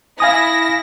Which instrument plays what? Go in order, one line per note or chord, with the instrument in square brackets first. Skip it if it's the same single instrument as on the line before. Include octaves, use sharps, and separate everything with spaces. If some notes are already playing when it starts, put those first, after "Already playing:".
[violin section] E4 A#6 [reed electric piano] F5 G#5 D#6